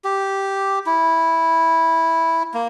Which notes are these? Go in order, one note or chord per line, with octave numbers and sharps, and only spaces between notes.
G4
E4
A#3